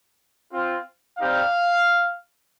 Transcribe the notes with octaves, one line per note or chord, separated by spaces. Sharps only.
C4 F4
G3 C4 D#4 G4 F5